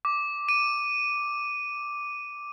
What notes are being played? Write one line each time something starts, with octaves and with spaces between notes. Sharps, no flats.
D6
D#7